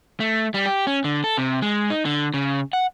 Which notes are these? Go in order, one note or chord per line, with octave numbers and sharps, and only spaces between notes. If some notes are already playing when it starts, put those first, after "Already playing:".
A3
G3
G4
C#4
D3
A4
C3
G#3
D#4
D3
C#3
F#5